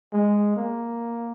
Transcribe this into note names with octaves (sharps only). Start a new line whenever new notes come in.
G#3
A#3